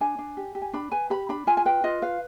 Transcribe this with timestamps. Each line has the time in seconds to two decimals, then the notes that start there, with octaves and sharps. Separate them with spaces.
0.01 D4 G#5
0.18 D4
0.37 G4
0.55 G4
0.62 G#5
0.73 D4 B5
0.92 B4 G#5
1.10 G4 B5
1.29 D4 B5
1.47 F4 G#5
1.57 G#5
1.65 B4 G5
1.84 F4 D#5
2.02 B4 F5